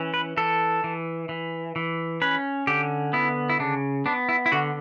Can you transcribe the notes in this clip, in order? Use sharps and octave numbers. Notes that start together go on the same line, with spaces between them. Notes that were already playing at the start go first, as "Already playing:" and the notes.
Already playing: E3 C#4
B4
E3 A4
E3
E3
E3
C#4 B4
D3 G4
B3 E4
E4
C#3 D4
B3 D4
E4
E4
D3 F#4